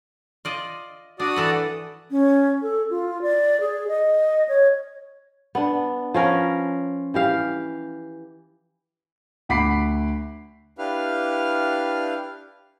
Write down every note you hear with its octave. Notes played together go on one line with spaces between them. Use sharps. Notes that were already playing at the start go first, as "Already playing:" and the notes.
F4 D5 D#5
D4 F#4 D5 D#6
E3 A4 B4
C#4
A4
F4
D5
G#4
D#5
C#5
B3 D4
F3 C#4 A#4 B4
E3 G4 F5
D2 F#5 B5 D6 B6 C7
D4 E4 G4 B4 F5 F6